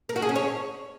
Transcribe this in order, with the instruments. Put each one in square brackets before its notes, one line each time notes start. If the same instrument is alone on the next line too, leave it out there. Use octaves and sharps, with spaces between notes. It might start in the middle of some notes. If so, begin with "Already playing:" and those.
[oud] A#4
F#4
G#4
C#4
C#5